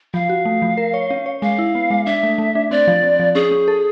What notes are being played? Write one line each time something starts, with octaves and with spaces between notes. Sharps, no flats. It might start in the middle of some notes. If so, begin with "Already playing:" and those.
F3 F5
F#4
A3
F3
A#4
C#5
C#4
C#5
G#3 F5
E4
B3
G#3
D4 E5
A3
A3
D4
C4 D5
F3
C4
F3
C#4 G#4
C#4
A4